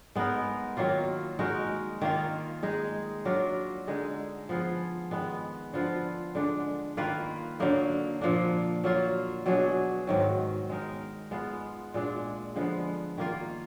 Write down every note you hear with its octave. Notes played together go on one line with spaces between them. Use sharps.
G#3 B3 D#4 A#4
D#3 F#3 A#3 F4
G#3 D#4 F#4 A#4
D#3 A#3 F4
G#3 D#4 G#4
F#3 D4 F4 A#4
D3 G#3 D#4 G#4
F3 B3 F4 G#4
D#3 G#3 B3
D3 F3 B3 F4
D3 G#3 D4
D#3 A#3 F4 B4
D3 F#3 A#3 D#4
A#2 F3 A#3 D4
F#3 A#3 F4
B2 F#3 D4 G#4
G#2 D#3 F#3
G#3 D#4 A#4
G#3 B3 F4
A#2 G#3 D4
D3 F3 G#3 B3
D#3 A#3 F4